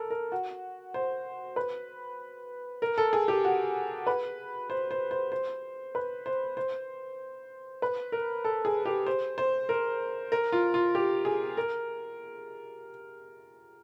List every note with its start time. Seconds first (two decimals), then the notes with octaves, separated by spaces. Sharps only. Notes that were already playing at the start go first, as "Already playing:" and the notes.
Already playing: A4 A#4
0.10 A#4
0.32 F#4
0.94 C5
1.56 B4
2.82 A#4
2.98 A4
3.13 G#4
3.28 G4
3.45 F#4
4.07 B4
4.70 C5
4.91 C5
5.11 C5
5.32 C5
5.95 B4
6.26 C5
6.57 C5
7.82 B4
8.12 A#4
8.45 A4
8.65 G#4
8.86 G4
9.07 C5
9.38 C5
9.69 A#4
10.32 A#4
10.52 F4
10.74 F4
10.95 G4
11.25 G#4
11.57 A#4